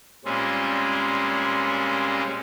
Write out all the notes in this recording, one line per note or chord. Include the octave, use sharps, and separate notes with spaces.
A#2 G3 G#3 C4 C#4